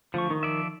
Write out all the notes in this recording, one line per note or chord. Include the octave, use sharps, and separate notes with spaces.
D3 F3 A3 C#6
D#3
F3 D5 E5